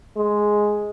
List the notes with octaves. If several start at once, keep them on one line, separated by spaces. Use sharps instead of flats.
G#3